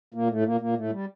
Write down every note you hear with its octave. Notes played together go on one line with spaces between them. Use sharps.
A#2 A#3
A2 A3
A#2 A#3
A#2 A#3
A2 A3
G3